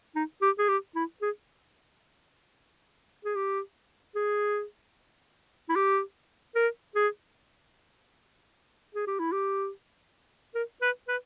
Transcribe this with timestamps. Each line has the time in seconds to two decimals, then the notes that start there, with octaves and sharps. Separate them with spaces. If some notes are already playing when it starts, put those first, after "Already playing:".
0.15 D#4
0.42 G4
0.59 G#4
0.69 G4
0.95 E4
1.22 G#4
3.25 G#4
3.36 G4
4.15 G#4
5.69 E4
5.76 G4
6.55 A#4
6.96 G#4
8.95 G#4
9.07 G4
9.20 E4
9.32 G4
10.55 A#4
10.82 B4
11.08 B4